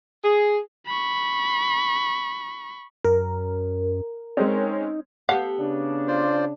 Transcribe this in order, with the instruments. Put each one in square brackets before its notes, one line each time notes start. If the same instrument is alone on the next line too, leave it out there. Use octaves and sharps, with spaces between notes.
[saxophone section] G#4
[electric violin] B5 C#6
[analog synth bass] F#2 [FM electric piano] A#4
[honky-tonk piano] G#3 C4 C#4 [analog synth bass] D#4
[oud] B3 G4 A4 [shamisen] F5 F#5
[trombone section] C#3 D4
[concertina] F4 C5 D5